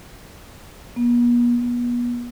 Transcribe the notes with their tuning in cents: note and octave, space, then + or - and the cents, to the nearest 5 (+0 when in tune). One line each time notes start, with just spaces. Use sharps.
B3 -45
B3 -35